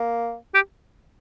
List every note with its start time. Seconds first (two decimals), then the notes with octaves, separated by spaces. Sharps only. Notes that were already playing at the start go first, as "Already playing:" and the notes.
Already playing: A#3
0.54 G4